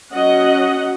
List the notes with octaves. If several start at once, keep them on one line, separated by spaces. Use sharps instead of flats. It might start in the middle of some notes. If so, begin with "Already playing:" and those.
F#3 C#4 D#5 F#5